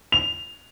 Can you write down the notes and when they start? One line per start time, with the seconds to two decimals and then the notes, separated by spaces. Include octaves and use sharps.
0.12 F7